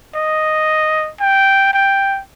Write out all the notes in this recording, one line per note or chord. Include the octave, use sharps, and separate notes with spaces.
D#5
G5
G5